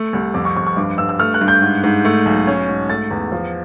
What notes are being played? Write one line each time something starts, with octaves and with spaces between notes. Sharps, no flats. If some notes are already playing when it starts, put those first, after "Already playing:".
Already playing: A3
C2
F2 D6
C#6
F2 C#6
C#6
G2 D6
G2 E6
E6
A3 F6
F#6
G2
G6
G#2
G#2
A3
B1
C#4
G#2
A3 A6
E2
F3